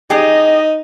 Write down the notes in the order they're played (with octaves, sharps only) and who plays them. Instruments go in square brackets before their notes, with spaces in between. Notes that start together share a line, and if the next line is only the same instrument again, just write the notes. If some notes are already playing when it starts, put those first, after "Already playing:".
[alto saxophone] D#4 [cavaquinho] G4 G#4 [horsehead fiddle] D#5